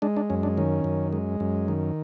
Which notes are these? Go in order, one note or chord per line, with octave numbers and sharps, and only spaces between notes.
G#3 D4
D4
F#2 C#4
D4
D#3 C#4
F#2
G#3
F#2
D#3